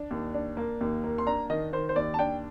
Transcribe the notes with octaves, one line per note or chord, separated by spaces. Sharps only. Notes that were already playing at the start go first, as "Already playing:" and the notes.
Already playing: D4
D#2
D4
A#3
D#2
A#3
C6
D4 A#5
D#3 D#5
D#3 C5
C5
D#2 D5
A5
D4 G5